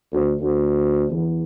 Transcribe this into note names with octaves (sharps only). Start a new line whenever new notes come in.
D2
D2
E2